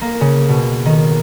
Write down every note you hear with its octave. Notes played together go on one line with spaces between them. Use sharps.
A#3
C#3
B2
D#3